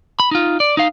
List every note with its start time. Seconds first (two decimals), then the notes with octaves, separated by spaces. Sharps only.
0.20 B5
0.31 D#4 F4
0.60 D5
0.77 D#4 F5